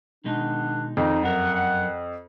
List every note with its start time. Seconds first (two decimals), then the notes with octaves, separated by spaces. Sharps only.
0.25 B2 D#3 G#3 B3 D4 D#4
0.97 F2 D#3 D#4
1.23 F#2 A#4 E5 F#5